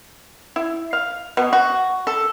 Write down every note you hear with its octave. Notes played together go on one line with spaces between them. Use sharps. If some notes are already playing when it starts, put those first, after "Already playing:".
E4
F5
B2
F#4
A4